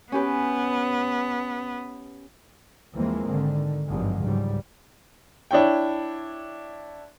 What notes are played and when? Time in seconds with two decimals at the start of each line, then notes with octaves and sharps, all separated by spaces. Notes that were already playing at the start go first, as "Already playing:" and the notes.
0.12 B3 C#4 G4 B4
2.96 D#2 E3 F3 G#3 A#3 C4
3.30 G#1 D3 D#3
3.86 G#1 G2 D3 F3 F#3 G#3
4.22 C#2 G#2 G3
5.51 D4 E4 C#5 G5